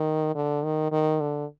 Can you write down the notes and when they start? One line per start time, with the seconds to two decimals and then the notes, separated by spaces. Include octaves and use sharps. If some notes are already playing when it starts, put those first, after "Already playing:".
Already playing: D#3
0.35 D3
0.64 D#3
0.92 D#3
1.21 D3